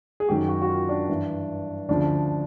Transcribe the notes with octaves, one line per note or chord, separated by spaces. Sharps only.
G#4
F#2 D#3 F#3 G4
F#4
F#4
F4
D4
G2 E3
D2 C#3 F3 D4